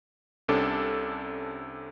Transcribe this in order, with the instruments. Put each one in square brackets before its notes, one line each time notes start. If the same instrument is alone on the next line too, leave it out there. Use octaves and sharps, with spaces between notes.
[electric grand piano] C2 C3 C#4 D4 A4 D6